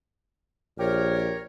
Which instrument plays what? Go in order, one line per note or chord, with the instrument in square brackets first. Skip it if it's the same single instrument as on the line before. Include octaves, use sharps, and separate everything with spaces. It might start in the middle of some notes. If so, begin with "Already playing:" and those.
[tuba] A#1 [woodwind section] G4 A#4 C#5